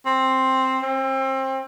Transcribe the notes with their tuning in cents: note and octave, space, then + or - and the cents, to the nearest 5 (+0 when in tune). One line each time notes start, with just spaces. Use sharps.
C4 +5
C4 +30